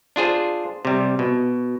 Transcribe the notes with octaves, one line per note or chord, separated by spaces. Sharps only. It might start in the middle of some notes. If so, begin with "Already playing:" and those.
D4 F4 G#4 C5
C3 G3
B2